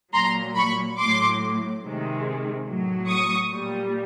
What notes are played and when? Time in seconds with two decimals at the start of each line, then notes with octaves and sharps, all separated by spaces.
0.14 A#2 F#3 A#5 C6
0.56 B5 C#6
0.98 A2 F#3 C6 D6
1.82 C3 D#3 G#3
2.67 A2 F#3
3.08 C#6 D#6
3.50 A#2 G3